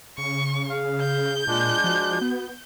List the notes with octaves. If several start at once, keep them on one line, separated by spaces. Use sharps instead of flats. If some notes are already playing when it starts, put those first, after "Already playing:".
C#3 C#6
G#4 F5
G6
A#2 G#3 D4 F4
F3 F#4
B3